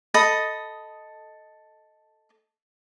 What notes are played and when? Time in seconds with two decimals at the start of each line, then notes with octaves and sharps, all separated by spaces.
0.14 A4 D#5 B5 D#6